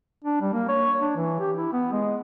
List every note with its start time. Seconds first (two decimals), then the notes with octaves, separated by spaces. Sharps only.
0.24 D4
0.41 G3
0.53 A#3
0.69 C#5
1.00 D4
1.16 E3
1.40 G4
1.56 E4
1.73 B3
1.92 G#3